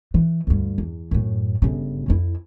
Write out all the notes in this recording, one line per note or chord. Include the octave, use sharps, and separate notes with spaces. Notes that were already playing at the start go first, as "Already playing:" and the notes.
E3
D2 G2
E2
F#2 A2
G1 C#3
F2 E4